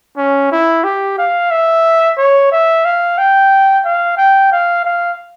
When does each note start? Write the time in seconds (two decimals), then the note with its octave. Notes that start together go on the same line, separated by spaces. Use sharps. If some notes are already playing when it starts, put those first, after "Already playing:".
0.17 C#4
0.52 E4
0.84 G4
1.18 F5
1.51 E5
2.18 C#5
2.52 E5
2.85 F5
3.18 G5
3.85 F5
4.17 G5
4.52 F5
4.85 F5